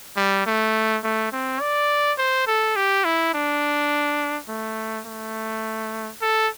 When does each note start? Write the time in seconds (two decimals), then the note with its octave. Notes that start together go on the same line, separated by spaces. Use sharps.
0.17 G3
0.46 A3
1.04 A3
1.32 C4
1.60 D5
2.18 C5
2.47 A4
2.76 G4
3.05 E4
3.34 D4
4.49 A3
5.06 A3
6.22 A4